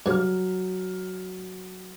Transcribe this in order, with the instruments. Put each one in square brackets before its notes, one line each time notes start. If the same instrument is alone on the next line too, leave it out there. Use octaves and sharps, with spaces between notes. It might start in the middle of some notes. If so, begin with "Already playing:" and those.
[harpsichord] G2 C#3 [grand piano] F#3 F6